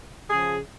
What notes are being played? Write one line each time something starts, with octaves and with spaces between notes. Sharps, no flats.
C#3 F3 G#4